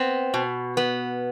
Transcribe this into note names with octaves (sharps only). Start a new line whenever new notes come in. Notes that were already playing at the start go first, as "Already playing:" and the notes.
Already playing: B3 C4
B2
B3